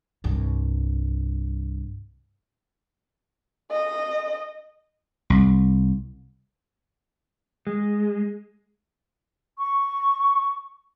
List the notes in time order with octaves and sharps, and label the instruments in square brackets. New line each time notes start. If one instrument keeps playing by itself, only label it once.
[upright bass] C2 G2
[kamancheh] D#5
[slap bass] C2
[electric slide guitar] G#3
[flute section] C#6